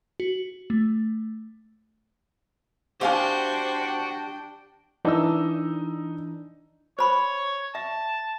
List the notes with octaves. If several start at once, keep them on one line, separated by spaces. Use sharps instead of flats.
F#4
A3
D4 F#4 G4 C5 F5 G5 G#5
E3 D4 D#4 D#5 E6
C5 C#5 B5 C6
E5 A5